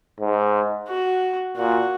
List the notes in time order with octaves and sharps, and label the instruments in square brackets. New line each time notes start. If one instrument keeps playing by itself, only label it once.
[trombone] G#2
[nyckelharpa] F#4
[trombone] A#2 [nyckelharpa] F#4